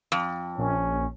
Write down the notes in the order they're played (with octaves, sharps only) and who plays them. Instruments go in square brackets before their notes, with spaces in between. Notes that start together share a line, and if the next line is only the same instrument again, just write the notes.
[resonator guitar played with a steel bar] F2
[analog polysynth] A#1 [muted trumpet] C#4